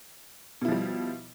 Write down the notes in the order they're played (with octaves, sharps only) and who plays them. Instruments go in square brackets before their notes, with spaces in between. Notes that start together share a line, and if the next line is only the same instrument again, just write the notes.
[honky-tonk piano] B2
E4
F3
G3